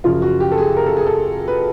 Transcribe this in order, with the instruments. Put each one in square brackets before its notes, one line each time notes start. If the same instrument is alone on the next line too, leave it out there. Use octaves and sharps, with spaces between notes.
[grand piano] F#2 C#3 F3 F4
F#4
G4
A4
G#4
A#4
A4
G#4
A4
B4